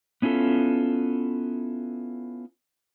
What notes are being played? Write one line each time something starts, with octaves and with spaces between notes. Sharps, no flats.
B3 C#4 E4 F4 A4